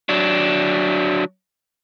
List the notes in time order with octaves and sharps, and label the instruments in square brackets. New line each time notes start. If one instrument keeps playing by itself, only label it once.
[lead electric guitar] F#3 D4